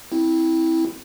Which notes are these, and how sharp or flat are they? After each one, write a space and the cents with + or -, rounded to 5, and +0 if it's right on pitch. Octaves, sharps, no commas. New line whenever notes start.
C4 +0 E4 -15